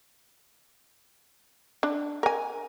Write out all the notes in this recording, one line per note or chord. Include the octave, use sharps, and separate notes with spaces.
D4
A#4 G#5